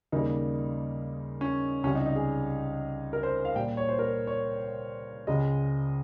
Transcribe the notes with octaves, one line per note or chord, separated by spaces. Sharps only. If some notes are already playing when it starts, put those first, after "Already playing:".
D#2 C#3 G3 A#3 D#4
C#4
C#2 C3 G3 C#4
D#4
D#4
G#4
A#4
C5
F5
A#2 G3 A#3 G5
C#5
C5
A#4
C#5
C#2 C#3 G#3 D#5